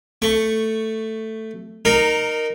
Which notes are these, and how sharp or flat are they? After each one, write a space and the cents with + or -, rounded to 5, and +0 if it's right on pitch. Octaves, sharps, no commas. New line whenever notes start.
A3 +5 C#6 +0
D#4 -20 A#4 +0